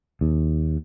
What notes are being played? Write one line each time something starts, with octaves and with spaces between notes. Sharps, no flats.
D#2